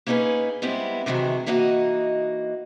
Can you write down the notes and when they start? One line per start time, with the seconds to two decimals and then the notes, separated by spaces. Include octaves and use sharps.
0.07 A#3 C#4 D#4 G4 G#4 B4
0.62 G3 G#3 B3 C4 E4
1.06 D2 C3 D#3 E3 F#3 G#3
1.46 E3 A#3 D#4 F#4 D#5